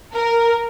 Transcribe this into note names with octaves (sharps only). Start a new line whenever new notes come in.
A#4